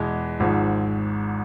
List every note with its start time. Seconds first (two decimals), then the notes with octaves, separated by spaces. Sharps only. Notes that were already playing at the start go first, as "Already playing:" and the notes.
Already playing: E2 B2 G#3 B3
0.40 G#1 G#2 F3